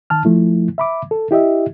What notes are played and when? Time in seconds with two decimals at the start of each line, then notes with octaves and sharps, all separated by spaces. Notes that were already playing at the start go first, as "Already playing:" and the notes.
0.10 D#3 A5 F6
0.25 F3 A3 E4
0.78 E5 B5 D6
1.11 A4
1.31 E4 G4 D#5 E5